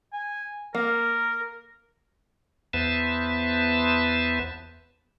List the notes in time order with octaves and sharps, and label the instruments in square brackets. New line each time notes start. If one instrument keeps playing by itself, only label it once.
[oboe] G#5
[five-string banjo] A#3 [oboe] A#4
[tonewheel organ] E2 B3 B4 C5 E5 A5